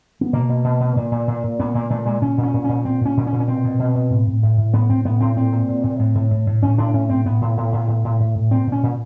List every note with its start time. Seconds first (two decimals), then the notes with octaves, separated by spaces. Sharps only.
0.21 B3
0.33 B2 A#3
0.49 B2
0.64 B2
0.80 B2
0.96 A#2
1.11 A#2
1.28 A#2
1.43 A#2
1.59 A#2 B3
1.74 A#2 A#3
1.90 A#2 A3
2.06 A#2 G#3
2.21 A#2 C#4
2.37 A#2
2.43 C#4
2.53 A#2
2.64 A#2 C#4
2.85 A#2 C4
3.01 A#2 C#4
3.17 A#2
3.27 C#4
3.32 A#2
3.40 C#4
3.47 B2 C4
3.64 B2
3.79 B2
3.95 B2
4.10 A2
4.27 A2
4.43 A2
4.57 A2
4.73 A2 B3
4.90 A2 C4
5.05 A2 B3
5.20 A2 C4
5.37 A#2 C4
5.52 A#2
5.69 A#2
5.83 A#2
5.99 A2
6.15 A2
6.31 A2
6.47 A2
6.63 A2 C#4
6.78 A2 D4
6.93 A2 C#4
7.09 A2 C4
7.25 A2 B3
7.41 A2
7.57 A2
7.72 A2
7.88 A2
8.04 A2
8.20 A2
8.35 A2
8.51 A#2 C4
8.67 A#2
8.72 C#4
8.83 A#2